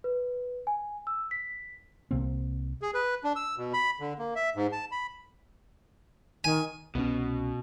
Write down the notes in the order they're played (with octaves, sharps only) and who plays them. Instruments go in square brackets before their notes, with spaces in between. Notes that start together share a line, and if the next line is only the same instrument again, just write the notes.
[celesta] B4
G#5
E6
B6
[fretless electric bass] C2 C3 A#3 C4
[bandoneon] G#4
B4
D4
E6
B2
B5
D3
A#3
E5
G#2
A5
B5
[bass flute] D#3 [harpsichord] G#5
[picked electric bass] C2 F3 C#4 [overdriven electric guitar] B2